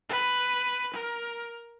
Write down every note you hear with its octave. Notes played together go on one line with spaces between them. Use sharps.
B4
A#4